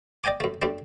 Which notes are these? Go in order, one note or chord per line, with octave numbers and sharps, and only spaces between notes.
D5 D#5 G5 G#5 D6
F#2 A3
F#2 G3 A3 D4